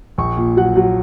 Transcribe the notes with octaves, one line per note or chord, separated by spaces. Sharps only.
A#1 C#6
A#2
F#3 F#5
F#3 F#5